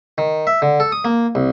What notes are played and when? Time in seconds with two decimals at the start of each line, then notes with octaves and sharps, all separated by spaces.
0.18 D#3
0.47 E5
0.62 D3
0.80 A4
0.92 D#6
1.05 A#3
1.35 C2